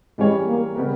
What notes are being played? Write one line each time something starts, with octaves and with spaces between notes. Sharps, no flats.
E3 G3 G#3 C#4 G#4 C#5
A#3
C#3 G3 B3 G4 A#4